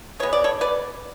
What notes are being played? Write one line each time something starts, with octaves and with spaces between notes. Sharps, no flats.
B2 G#3 B3 C#5
D5
A4 C#5
B4 D5